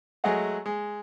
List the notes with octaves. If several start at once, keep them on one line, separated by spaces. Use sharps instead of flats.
F#3 G#3 A3 G#4 D#5 F#5
G#3